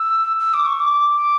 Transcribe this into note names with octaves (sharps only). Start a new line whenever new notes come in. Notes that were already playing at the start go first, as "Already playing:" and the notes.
Already playing: E6
E6
D6
C#6
D6